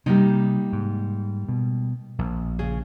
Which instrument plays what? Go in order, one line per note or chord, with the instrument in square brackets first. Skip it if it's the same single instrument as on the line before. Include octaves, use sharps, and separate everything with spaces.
[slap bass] C3 [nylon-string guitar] G3 A#3 D#4
[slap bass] G#2
B2
A#1
[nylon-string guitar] C#3 G#4